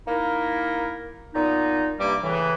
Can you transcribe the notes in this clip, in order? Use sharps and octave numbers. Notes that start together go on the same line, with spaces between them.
A#3 D#4 E4 A#4
A#2 B3 D#4
G2 C3 G3 A#3 D6
A2 C#3 E3